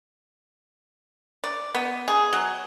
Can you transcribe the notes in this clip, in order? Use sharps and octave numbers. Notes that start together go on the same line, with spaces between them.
D5
B3
G#4
F#3